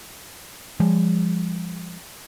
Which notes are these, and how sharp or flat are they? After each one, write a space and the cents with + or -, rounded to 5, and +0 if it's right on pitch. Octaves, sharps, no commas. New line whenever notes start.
F3 -15 G#3 -40